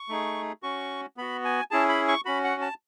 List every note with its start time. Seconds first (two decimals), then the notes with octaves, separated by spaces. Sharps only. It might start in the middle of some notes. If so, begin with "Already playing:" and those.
Already playing: C#6
0.09 A3 D#4 G#4
0.63 C#4 F#4 C#6
1.17 B3 F#4 B5
1.45 G#5
1.71 C#4 E4 G#4 A5
1.89 B5
2.08 C#6
2.25 C#4 F#4 B5
2.44 F#5
2.62 A5